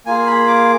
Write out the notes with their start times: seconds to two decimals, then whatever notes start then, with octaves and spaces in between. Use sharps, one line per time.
0.06 A#3 F4 G#4 G#5
0.27 B5
0.47 D6